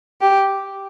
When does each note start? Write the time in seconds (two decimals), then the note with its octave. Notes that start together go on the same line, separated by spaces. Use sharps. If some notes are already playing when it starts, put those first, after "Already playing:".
0.21 G4